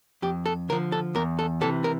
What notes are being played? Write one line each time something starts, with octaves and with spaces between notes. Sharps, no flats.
F2 G4
A4
D3 F3 A#4
A4
E2 A#4
A4
C3 E3 A4
A#4